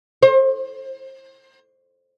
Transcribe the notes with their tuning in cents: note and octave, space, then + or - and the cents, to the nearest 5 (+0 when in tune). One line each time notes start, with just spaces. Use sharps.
C5 +30